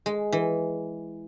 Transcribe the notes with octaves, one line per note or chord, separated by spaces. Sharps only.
G#3
E3